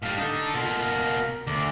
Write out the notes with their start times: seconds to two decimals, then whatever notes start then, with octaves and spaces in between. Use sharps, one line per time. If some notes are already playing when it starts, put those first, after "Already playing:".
0.02 A2 G3 F5
0.18 D4 D#4 A4
0.54 B2 A#3 F4
0.81 A#4
1.47 D2 D6